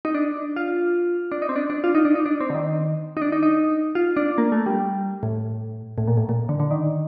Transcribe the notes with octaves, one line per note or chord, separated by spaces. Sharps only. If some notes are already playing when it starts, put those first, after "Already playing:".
D#4
D4
F4
D4
D#4
C4
D4
D4
F4
D#4
D4
D#4
D4
C4
D3
D#3
D#4
D4
D#4
D#4
F4
D4
A#3
A3
G3
A2
A2
A#2
A2
A#2
D3
D3
D#3